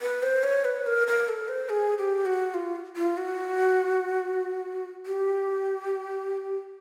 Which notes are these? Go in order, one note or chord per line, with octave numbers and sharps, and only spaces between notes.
B4
C5
C#5
B4
A#4
A#4
A4
C5
G#4
G4
F#4
F4
F4
F#4
G4